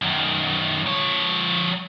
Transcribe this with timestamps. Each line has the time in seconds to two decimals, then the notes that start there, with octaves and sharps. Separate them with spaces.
0.02 F#2 D#3
0.86 F3 C#5